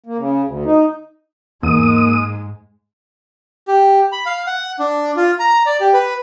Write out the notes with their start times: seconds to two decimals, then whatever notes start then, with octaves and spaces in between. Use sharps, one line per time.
0.06 A#3
0.18 C#3
0.45 D2
0.65 D#4
1.63 E2 G#2 G#3 A#3 D#6
3.68 G4
4.12 B5
4.26 F5
4.47 F#5
4.79 D4
5.17 F4
5.39 A#5
5.66 D5
5.81 G4
5.94 B4